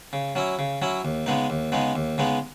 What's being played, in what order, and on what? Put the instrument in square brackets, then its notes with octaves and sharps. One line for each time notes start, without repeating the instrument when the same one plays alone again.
[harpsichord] C#3
F#3 C#4 E4
C#3
F#3 C#4 E4
D#2
C#3 G#3 B3 D#4
D#2
C#3 G#3 B3 D#4
D#2
C#3 G#3 B3 D#4